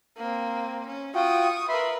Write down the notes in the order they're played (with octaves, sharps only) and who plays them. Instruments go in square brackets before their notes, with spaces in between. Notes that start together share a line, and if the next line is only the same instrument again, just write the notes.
[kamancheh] A#3 C4
C#4
[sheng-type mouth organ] F4 F#4 G5 [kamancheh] C#6 D#6
[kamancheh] A#4 B4 [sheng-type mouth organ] E5 B5 C6